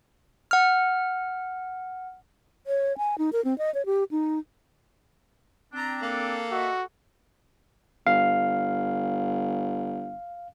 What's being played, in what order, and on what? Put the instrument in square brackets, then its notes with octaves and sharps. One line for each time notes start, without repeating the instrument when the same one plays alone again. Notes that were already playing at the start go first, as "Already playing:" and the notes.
[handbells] F#5 F6
[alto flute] C#5
G#5
D#4
A#4
C4
D#5
C#5
G4
D#4
[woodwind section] C4 D4 [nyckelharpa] G5 A#5
[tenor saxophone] A#3 [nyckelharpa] A4
[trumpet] F#4 [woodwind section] D#5 E5
[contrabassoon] G1 [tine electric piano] F5